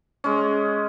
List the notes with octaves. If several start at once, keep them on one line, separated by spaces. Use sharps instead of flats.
G#3 C#4